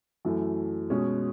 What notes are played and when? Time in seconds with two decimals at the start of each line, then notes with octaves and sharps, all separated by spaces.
0.25 F#2 E3 A3
0.90 B2 G#3 C#4